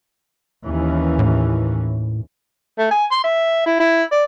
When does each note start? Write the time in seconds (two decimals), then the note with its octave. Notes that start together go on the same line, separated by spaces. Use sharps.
0.65 D#2 E3 C#4
1.19 A2
2.79 A3
2.91 G#5
3.11 C6
3.24 E5
3.66 E4
3.80 E4
4.12 D5